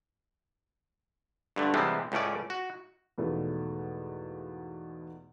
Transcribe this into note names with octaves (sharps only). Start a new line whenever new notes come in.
G2 D3 A3
C3 E3 G3 G#3 B3 C4
C#2 A2 A3 C#4 D5
F#4
E2 G#2 B2 F3 A3